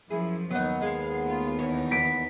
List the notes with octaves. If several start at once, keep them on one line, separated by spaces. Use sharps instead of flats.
F#2 F3 E4 G#4
D#2 F#3 B3 D#4
G#3 F5
A3 F4
E2 D#3 E3 D#4 C#5
B6 D7